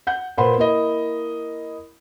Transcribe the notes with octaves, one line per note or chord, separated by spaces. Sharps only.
F#5 G6
A#2 B4 C5 F#5 B5 C6
A#3 E4 D#5